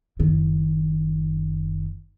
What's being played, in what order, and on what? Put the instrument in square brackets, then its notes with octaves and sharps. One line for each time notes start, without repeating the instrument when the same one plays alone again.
[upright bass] F#1 D#3